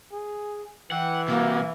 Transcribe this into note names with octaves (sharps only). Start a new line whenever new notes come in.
G#4
E3 F#5 G5
C3 G3 A#3 F#4